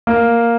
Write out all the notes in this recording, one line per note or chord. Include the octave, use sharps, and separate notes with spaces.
A#3